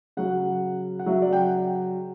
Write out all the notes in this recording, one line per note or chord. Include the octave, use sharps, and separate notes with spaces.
C#3 F#3 F#5
F#5
C#3 F#3 E5
D5
G5
F#5